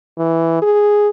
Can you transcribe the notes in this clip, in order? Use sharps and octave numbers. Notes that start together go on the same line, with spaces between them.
E3
G#4